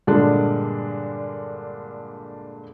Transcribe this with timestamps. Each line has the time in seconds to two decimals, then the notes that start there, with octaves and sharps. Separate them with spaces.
0.07 G2 A#2 D3 G#3 D4